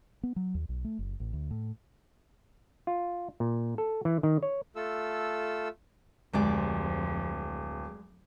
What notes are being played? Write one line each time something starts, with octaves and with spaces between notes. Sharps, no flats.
B3
F#3
D#2
B1
A3
F#1
A1
D2
A2
F4
A#2
A4
E3
D#3
C#5
A3 F4 A4 E6
D1 F2 G#3 G4 D5